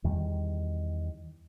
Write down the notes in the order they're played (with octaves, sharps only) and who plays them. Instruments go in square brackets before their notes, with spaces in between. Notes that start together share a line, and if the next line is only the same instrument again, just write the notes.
[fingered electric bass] E2 D#3 G3